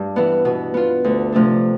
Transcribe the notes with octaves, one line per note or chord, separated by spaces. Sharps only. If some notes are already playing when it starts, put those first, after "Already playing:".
Already playing: G2
E3 B3
B2
B3 F4
D2
C3 F3 A3 D4